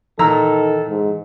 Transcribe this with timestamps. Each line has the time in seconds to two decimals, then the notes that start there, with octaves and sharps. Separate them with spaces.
0.19 A#2 D#3 E3 A4 A#5 E6
0.88 G#2